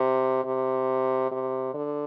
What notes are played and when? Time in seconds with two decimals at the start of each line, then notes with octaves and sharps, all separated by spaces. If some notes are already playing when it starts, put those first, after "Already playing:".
Already playing: C3
0.45 C3
1.31 C3
1.74 D3